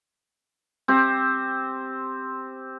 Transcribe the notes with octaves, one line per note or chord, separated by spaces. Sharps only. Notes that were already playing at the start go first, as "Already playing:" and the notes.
C4 G4